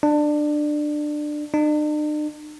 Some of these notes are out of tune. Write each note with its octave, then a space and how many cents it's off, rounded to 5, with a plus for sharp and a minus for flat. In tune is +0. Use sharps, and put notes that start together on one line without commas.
D4 +20
D4 +45